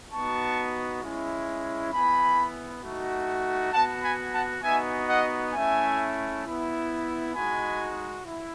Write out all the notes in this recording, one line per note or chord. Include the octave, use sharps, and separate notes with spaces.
B3 D#4 F#4 A5 C#6
G#3 C#4 E4
B3 E4 G#5 B5
A3 D#4 F#4
B3 F#4 F#5 A5
G#5 B5
F#5 A5
B3 D#4 F#4 E5 G#5
D#5 F#5
A3 C#4 E4 E5 G#5
B3 E4
G#3 D#4 F#4 G#5 B5
E4